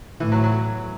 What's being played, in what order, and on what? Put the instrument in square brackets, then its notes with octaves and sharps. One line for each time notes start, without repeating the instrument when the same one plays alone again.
[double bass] A2 [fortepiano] E3
[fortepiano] F#3
F#3